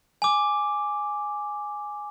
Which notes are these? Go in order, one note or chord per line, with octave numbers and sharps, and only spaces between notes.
G#5 D6